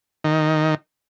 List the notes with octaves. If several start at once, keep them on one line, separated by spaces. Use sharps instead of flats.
D#3